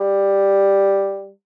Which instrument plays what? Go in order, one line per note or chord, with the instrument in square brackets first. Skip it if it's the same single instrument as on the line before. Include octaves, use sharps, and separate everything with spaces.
[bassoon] G3